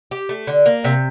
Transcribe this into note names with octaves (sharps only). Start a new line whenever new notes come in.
G4
A3
D3
A#3
C3